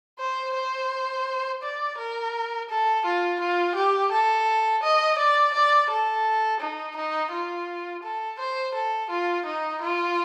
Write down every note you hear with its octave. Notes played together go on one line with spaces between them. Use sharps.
C5
C5
D5
A#4
A4
F4
F4
G4
A4
D#5
D5
D5
A4
D#4
D#4
F4
A4
C5
A4
F4
D#4
F4